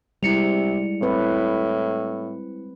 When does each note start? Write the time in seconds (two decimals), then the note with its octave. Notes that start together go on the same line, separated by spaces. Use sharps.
0.23 C3 G3 G#3 E4 C#7 F7
1.02 A2 C4 B4